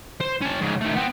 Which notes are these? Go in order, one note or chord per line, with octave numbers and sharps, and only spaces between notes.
C5
C#4 A5
G#2 C#3
D#3 A3
B3 C4